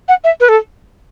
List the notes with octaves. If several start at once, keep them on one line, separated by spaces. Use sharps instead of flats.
F#5
E5
B4
A4